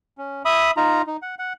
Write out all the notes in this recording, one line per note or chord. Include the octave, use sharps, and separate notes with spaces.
C#4
E5 B5 D#6
D#4 F4 A#5
D#4
F#5
F#5